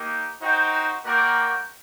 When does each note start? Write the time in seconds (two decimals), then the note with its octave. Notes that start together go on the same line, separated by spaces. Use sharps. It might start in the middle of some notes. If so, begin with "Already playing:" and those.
Already playing: A#3 D#4 G4
0.40 D#4 F#4 C5 G5
1.04 A#3 F#4 A#4 D5 G5